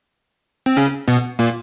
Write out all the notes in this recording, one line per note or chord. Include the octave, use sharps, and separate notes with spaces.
C4
C#3 C#4
B2 B3
A#2 A#3